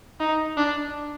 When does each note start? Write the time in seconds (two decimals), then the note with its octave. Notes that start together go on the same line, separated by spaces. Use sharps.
0.20 D#4
0.57 D4